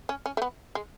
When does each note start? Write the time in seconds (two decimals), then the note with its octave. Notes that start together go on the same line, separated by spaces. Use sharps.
0.09 C#4
0.26 C#4
0.37 A3
0.42 B3
0.75 G#3